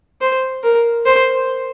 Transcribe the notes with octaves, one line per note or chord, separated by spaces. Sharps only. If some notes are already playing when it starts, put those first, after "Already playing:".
C5
A#4
C5